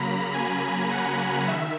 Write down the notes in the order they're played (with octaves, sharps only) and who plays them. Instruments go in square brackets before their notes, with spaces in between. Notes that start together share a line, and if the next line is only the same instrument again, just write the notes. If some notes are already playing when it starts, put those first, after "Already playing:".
Already playing: [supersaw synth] C#3 F#3 A#3 A#5 B5
G#5
F#5
D#3 E5